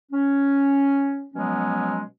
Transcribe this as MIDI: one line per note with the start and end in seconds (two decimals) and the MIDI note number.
0.12 1.25 61
1.34 2.01 47
1.34 2.01 53
1.34 2.01 54
1.34 2.01 56
1.34 2.01 59
1.34 2.01 61